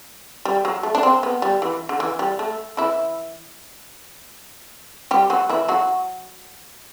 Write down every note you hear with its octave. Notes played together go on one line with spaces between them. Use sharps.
G3
F#3
A3
D4
C4
B3
G3
E3
D3
E3
G3
A3
E3 E4
G3 G4
F#3 F#4
E3 E4
F#3 F#4